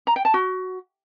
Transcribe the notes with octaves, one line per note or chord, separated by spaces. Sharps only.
A#5
G5
A5
F#4